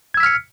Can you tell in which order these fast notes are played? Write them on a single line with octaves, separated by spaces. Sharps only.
G#6 E6 B6 F6 C#7